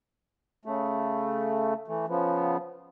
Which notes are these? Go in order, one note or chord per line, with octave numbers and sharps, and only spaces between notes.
C#3 A3
E3 A3
C#3 F3 B3